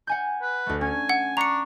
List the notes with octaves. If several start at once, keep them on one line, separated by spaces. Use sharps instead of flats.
F#5 G#5 G6
B4
D2 A3
C#4 G#5
F#5
D4 A#5 C#6 C#7 F7